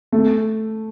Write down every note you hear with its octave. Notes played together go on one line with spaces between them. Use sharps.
A3